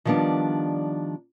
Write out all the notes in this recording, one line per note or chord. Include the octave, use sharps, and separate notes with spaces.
D#3 F3 G3 B3 D4